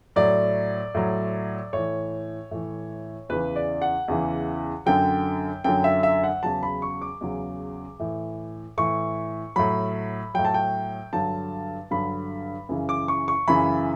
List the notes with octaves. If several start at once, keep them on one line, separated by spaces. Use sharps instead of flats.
A2 F#3 D5
A2 F#3
A2 E3 C#5
A2 E3
E2 C#3 E3 B4
D5
F#5
E2 C#3 E3
F#2 D3 F#3 G5
F#2 D3 F#3 G5
E5
E5
F#5
E2 C#3 F#3 A5
B5
C#6
D6
E2 C#3 F#3
A2 E3
A2 E3 C#6
A2 F#3 B5
A2 F#3 G5
A5
G5
G2 D3 F#3 A5
G2 D3 F#3 B5
F#2 C#3 E3
D6
C#6
C#6
F#2 C#3 E3 B5